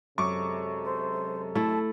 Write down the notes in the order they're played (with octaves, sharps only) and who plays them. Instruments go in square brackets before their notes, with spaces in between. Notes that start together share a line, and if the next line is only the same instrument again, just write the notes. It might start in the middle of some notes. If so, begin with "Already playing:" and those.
[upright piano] F#2 C#6 D6 [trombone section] C3 G#3 A4
[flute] C5
[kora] A3 E4 [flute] A5